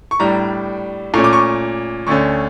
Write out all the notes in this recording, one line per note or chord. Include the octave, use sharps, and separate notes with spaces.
C#6
A2 G3 D4 A#5
A#2 A3 C#4 C#6
D6
C#6
D2 D3 A3 C#4 C#6